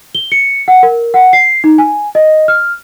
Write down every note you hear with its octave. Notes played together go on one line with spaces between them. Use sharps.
G7
C#7
F#5
A#4
F#5
C7
D#4
G#5
D#5
F6